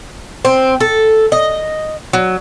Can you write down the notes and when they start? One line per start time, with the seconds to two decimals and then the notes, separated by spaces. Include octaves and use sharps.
0.45 C4
0.80 A4
1.32 D#5
2.13 F#3